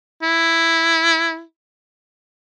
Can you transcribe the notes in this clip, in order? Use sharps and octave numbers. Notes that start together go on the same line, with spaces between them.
E4